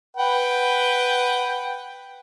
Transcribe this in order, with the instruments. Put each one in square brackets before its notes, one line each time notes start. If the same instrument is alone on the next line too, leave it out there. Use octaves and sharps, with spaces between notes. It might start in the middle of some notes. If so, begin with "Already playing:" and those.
[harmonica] B4 F#5 G5